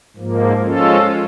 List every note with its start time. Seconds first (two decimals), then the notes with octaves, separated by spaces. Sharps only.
0.16 G#2 F3 A#3
0.62 F3 G#3 C#4 F4 A4